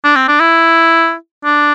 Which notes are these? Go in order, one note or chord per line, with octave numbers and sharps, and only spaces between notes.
D4
C4
D4
E4
D4